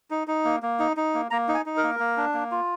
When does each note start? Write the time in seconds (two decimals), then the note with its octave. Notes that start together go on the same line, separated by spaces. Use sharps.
0.11 D#4
0.27 D#4
0.45 A#3
0.63 A#3
0.79 D#4
0.97 D#4
1.14 A#3
1.31 A#3 A#5
1.48 D#4
1.54 G#5
1.66 D#4
1.77 A#4
1.83 A#3
2.00 A#3
2.17 D4
2.34 A#3
2.51 F4